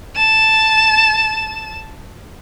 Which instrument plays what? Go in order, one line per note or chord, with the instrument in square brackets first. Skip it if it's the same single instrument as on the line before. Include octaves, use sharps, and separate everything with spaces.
[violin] A5 E7